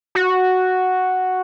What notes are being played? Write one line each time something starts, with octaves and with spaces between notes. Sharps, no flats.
F#4